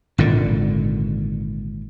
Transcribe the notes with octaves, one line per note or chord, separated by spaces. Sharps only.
G#1 A#2 D3